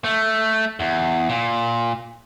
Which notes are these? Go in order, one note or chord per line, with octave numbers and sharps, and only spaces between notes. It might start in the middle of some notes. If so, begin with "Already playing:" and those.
A3
E2
A#2